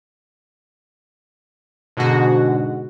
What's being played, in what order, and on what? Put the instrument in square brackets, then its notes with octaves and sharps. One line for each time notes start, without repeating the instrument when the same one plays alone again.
[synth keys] G#2 B2 D3 G#3 F#4